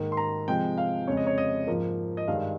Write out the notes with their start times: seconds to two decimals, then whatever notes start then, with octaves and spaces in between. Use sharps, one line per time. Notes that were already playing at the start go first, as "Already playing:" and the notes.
Already playing: G#2 D#3 A#3
0.12 C6
0.17 A#5
0.48 C3 F3 G#3 G5
0.78 F5
1.07 F2 C#3 G#3 C#5
1.17 D#5
1.27 C#5
1.38 D#5
1.67 G#2 F3 A#3
2.17 D#5
2.27 G2 D#3 G#3 F5